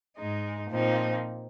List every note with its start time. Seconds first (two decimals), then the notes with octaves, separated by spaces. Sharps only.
0.16 G#2 G#3 D#4
0.70 A#2 F3 C4 D#4